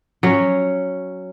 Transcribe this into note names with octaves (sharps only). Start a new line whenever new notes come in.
F#3 C#4